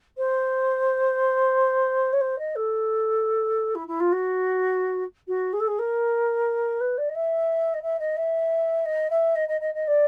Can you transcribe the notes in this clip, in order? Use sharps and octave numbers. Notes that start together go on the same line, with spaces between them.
C5
C#5
C5
D#5
A4
E4
E4
F4
F#4
F#4
G#4
A4
G#4
A#4
B4
D5
D#5
E5
D#5
E5
D#5
E5
D#5
E5
D#5
D#5
D#5
D#5
D5